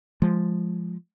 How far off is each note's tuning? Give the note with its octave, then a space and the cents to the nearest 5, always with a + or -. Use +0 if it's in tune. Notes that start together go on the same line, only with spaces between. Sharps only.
F3 +0 G#3 +0